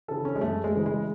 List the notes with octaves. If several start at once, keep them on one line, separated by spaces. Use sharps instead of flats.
C#3 E3 A4
C#4
G#3
F#2 A3
G#3
C#3 E3
G#3